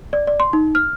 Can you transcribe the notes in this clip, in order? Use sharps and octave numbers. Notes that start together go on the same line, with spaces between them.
D5
D5
C6
D#4
F6